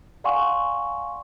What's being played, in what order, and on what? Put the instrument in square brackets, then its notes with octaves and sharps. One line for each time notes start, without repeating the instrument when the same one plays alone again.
[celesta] D5 F5 F#5 G#5 C6 C#6